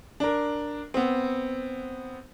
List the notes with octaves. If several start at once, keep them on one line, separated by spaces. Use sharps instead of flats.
D4 A#4
B3 C4